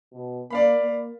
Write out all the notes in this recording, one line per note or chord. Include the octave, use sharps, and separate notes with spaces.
B2
A#3 D5 F5 B5
A#3